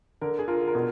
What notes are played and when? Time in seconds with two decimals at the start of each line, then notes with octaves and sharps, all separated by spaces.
0.21 D3 A#4
0.39 G#4
0.48 F4 A#4
0.68 A#4
0.75 B2 G#4